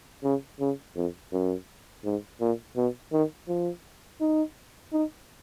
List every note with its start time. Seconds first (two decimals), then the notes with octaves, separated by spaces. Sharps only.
0.24 C#3
0.60 C#3
0.96 F2
1.32 F#2
2.05 G#2
2.41 A#2
2.77 B2
3.12 D#3
3.48 F3
4.21 D#4
4.93 D#4